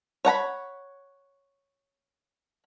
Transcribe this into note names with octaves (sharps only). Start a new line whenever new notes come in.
C#5 F#5 A#5 B5